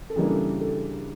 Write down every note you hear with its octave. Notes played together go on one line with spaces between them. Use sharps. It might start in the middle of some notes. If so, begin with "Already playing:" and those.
A4
C#3 E3 G3 A#3 D4 G#4
A4
A4